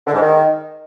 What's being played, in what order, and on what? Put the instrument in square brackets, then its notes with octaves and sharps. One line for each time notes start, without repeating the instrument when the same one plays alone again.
[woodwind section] D3
G#2
D#3